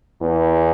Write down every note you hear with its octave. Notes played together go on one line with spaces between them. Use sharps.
E2